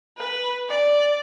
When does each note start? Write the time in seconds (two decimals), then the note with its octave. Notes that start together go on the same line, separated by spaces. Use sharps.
0.18 B4
0.70 D5